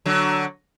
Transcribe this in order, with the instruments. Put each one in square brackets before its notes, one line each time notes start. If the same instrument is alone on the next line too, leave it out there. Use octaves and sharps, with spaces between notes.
[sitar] D3 F#3